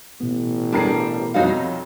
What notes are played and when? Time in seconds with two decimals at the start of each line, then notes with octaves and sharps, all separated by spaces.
0.21 A1 B2 B3
0.72 G3 D4 G4 G#4 A#4 C7
1.34 F2 F#3 G3 D#4 F#4 F5